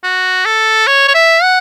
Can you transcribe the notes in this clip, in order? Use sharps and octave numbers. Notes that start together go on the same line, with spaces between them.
F#4
A4
C#5
C#5
E5
F#5